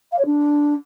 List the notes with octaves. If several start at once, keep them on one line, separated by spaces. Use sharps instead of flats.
F5
C#5
D4